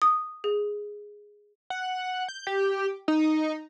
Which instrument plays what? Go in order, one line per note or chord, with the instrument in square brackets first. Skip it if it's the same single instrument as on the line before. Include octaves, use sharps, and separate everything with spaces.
[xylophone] D#6
G#4
[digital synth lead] F#5
G6
G4
D#4